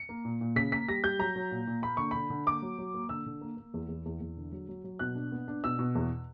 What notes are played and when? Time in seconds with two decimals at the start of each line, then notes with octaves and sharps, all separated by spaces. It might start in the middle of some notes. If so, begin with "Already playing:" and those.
Already playing: C#7
0.09 A#3
0.25 A#2
0.41 A#2
0.56 C#3 B6
0.72 A#3 B6
0.89 G3 A#6
1.04 G3 G6
1.19 F#3 A#5
1.36 F#3
1.51 A#2
1.67 A#2
1.82 A#3 B5
1.97 D3 C#6
2.11 D3 B5
2.30 D3
2.46 A#3 D6
2.62 F#3
2.79 F#3
2.94 A#3
3.09 D3 E6
3.26 D3
3.41 A#3
3.57 A#3
3.74 E2
3.88 E2
4.06 E2
4.20 E2
4.37 D3
4.52 F#3
4.69 F#3
4.84 F#3
4.99 B2 F#6
5.15 D4
5.32 B3
5.48 D4
5.64 B2 E6
5.79 B2
5.95 E2